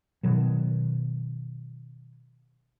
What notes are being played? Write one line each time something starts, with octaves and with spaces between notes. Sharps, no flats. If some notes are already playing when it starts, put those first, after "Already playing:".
B2 D#3 F#3